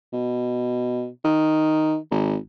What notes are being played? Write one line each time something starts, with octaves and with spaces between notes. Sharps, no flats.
B2
D#3
G#1